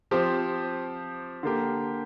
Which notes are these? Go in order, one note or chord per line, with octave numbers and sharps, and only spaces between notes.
F3 C4 G4
D3 A#3 G4